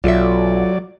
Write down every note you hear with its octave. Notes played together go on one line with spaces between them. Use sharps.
B1 F#3 F4 A4 D5 E5